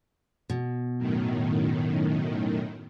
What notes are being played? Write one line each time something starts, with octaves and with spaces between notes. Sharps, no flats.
B2
F#2 A2 D#3